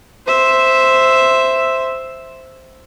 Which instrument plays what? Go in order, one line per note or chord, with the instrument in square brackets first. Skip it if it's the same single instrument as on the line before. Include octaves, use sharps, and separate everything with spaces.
[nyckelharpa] C5 E5